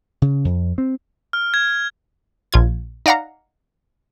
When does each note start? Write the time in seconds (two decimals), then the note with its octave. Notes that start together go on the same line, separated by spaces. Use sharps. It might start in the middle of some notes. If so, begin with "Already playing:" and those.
0.22 C#3
0.45 F2
0.78 C4
1.33 F6
1.54 G#6
2.52 A#1 F4 G#6
3.06 D#4 D5 F5 F#5 A#5